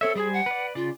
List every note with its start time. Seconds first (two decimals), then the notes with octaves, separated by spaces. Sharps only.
0.01 C4 A4 C#5 E5
0.15 G3 G#4 C5 G#5
0.33 F#5
0.46 B4 D5
0.75 C#3 F4 D5